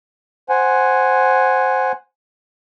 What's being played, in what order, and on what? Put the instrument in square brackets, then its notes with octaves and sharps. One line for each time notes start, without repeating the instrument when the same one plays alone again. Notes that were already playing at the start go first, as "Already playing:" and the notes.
[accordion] C5 F#5 G#5